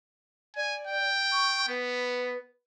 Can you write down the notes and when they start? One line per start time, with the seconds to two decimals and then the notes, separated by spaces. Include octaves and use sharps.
0.56 D5 G#5
0.87 G5
1.32 C#6
1.68 B3 B4